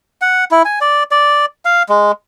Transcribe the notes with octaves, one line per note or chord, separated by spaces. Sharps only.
F#5
E4
G#5
D5
D5
F5
G#3